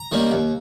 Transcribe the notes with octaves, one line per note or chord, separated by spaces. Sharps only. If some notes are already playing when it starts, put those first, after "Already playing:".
Already playing: A#5
D#3 G3 A#3 C#4
D#2